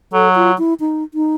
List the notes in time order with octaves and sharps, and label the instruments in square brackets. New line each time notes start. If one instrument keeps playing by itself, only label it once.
[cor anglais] F#3 [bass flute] A4
[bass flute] F4
E4
D#4
D#4